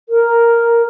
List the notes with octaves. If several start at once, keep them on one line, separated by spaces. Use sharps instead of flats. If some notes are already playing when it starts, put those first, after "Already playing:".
A#4